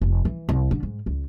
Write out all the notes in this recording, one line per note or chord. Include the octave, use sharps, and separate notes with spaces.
F1
E3
C2
D3
G#2
C#2